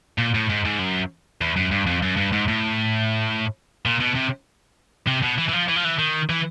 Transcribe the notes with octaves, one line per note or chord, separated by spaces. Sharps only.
A#2
A2
G#2
G#2
F#2
E2
F#2
G2
F2
F#2
G2
G#2
A2
A#2
B2
C3
C3
B2
E3
E3
F3
E3
F3
E3
D#3
E3